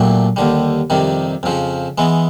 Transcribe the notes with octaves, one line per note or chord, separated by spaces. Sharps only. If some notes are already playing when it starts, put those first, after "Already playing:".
Already playing: A#2 F#3 A3 D4 G4
D#2 D3 G3
F2 C3 D#3 G3
F2 C#3 F3
E3 G#3 B3